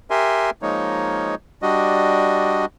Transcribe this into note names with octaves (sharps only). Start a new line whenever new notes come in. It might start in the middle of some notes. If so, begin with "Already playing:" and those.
G4 A#4 E5 G#5 C6
F3 G#3 A#3 D#4 C#5
G3 D4 F#4 D#5